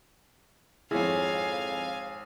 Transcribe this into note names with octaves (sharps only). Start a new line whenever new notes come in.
G#1 F2 E4 G#4 C#5 F5 G#5